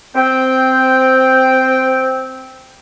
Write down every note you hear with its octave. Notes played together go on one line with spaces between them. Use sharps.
C4 G5